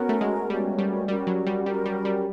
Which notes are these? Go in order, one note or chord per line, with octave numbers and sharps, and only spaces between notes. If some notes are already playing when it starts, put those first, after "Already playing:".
Already playing: B3 C#4 F#4 A#4
A3
G#3
G3 C#4 F#4 A#4
G3
G3 C#4 F#4 A#4
F#3
G3
G3 C#4 F#4 A#4
G3
G3